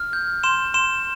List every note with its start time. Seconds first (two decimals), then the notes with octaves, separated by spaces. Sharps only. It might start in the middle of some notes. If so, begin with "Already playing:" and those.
Already playing: F6
0.13 G6
0.43 C6 E7
0.74 C6 E7